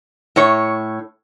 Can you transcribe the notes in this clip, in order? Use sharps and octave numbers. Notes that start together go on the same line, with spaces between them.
A2 C#5